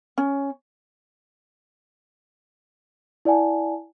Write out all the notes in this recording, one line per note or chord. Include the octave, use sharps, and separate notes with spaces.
C#4
E4 D5 F#5 G#5 A5